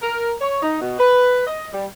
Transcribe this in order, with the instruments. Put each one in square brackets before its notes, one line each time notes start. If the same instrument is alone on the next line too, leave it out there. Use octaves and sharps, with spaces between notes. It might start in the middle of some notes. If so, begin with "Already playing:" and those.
[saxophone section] A#4
C#5
D#4
B2
B4
D#5
G3